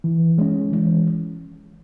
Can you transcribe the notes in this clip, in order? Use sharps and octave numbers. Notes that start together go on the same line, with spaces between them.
E3
G#3 C#4
E3